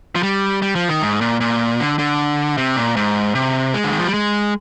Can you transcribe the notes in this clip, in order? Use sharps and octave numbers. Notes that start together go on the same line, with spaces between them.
F3
G3
G3
F3
D#3
G#2
A#2
A#2
D3
D3
C3
A#2
G#2
C3
G#3
D3
D#3
F3
G3
G#3